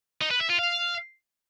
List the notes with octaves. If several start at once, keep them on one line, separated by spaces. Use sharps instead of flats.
D#4
B4
E5
F4
F5